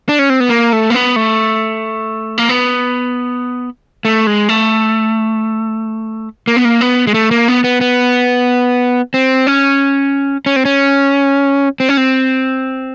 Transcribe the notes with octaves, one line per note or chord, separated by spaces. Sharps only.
D4
C#4
C4
B3
A#3
A3
A#3
B3
A3
A#3
B3
A3
G#3
A3
A#3
B3
A#3
B3
G#3
A3
A#3
B3
B3
B3
C4
C#4
C#4
C4
C#4
C4
C#4
C4